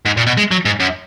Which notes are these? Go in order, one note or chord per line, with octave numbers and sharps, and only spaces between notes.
G#2
A#2
B2
G#3
F#3
G#2
F#2